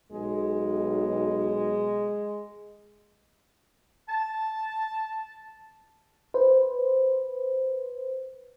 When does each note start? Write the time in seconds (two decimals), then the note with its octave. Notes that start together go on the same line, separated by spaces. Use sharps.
0.12 B1 G#3
4.09 A5
6.34 B4 C5